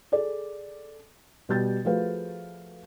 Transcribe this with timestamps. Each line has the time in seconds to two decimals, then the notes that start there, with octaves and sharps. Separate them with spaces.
0.12 G#4 A4 D5
1.49 B2 G3 G6 A6
1.85 F3 A3 F#4 G#4 B4 F5